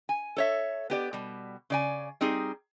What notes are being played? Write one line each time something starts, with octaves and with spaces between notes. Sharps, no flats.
G#5
A4 C#5 E5
B3 G4 D5
B2 G3
C#3 D5 G#5
G3 C4 D#4 G#4